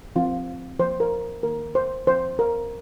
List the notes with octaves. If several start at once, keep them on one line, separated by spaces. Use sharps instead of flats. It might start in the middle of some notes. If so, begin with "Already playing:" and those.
F3 C4 F4
F3 A#3 C5
A#4
D#3 A#3 A#4
C5
F3 C4 C5
A#4